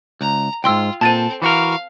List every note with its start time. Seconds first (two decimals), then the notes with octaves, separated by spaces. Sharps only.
0.21 C#2 A#5
0.64 C2 G#2 F4 G5 C6 E6
1.01 A#2 C4 A4 A5 A6 D#7
1.42 E3 F#4 A#4 F5